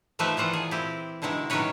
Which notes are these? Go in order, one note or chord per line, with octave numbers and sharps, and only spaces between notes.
D#3 F3 A3 G4 B4 E5
A#2 E3 F4 F#5
G#4
C4 E4 G4
B2 D3 D#3 G#3 E4
A2 D#3 F#3 C#4 B4 C#5